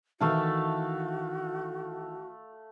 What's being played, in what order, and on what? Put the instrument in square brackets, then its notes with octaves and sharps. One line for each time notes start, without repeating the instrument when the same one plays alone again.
[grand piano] D#3 E3 E4 [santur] A3 F5 A5 [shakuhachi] F#4